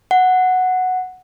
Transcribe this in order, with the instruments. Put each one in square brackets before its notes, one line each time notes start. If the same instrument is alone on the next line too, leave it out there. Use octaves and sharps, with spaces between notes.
[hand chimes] F#5